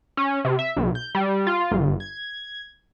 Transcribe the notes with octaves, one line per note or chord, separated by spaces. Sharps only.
C#4
C3
E5
B1
G6
G3
F4
G1
G#6